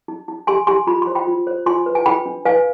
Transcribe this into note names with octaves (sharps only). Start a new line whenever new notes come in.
D#4
D#4
G4 G#5 C6
G4 G#5 C6
F4 B5
C6
C5
G5 B5
F4
C5
F4 G#5 C6
B4
G#5
D4 G5 B5
D4
B4 F5 G#5